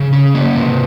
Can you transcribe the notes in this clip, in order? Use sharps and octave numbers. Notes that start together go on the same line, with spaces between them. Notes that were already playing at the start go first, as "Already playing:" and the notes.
Already playing: C#3
C#4
A#3
C3